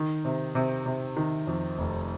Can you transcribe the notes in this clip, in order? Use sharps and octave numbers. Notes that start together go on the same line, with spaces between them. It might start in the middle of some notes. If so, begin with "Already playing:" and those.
Already playing: D#3
C3
C3
C3
D#3
F2
F1